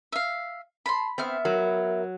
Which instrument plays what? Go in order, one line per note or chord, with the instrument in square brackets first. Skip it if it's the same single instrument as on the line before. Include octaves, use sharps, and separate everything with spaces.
[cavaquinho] E5 F5
[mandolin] A5 C6 [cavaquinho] B5
[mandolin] B3 E5 F6 [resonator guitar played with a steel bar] C4
[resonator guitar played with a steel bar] F#3 [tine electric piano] A#4